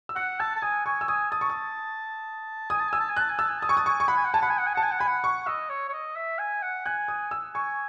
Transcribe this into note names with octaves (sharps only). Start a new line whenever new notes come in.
E6
F#5 F#6
A5 E6
A5
G#5 D#6
G#5 C#6
E6
G#5 D#6
A5 D#6
C#6
D#6
G#5 D#6
A5
G#5 E6
A5
G#5
A5 F#6
G#5
A5 E6
G#5
A5 D#6
G#5 C#6
A5 D#6
G#5 C#6
C#6
F#5 B5
G#5
F#5
G#5 A5
F#5 B5
G#5
F#5
G#5
F#5 A5
G#5
F#5
G#5 B5
F#5
C#6
D#5 E6
C#5
C#5
D#5
E5
G#5
F#5
G#5 F#6
D#6
E6
G#5 C#6